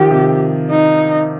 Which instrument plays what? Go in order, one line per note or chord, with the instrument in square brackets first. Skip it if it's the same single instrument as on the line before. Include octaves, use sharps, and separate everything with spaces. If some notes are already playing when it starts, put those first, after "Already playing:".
Already playing: [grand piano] D#3 F3 [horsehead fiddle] G4
[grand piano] C3
[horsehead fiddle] D#4